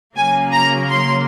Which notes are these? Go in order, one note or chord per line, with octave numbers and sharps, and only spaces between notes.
C#3 F#3 A#3 G#5
A#5
C6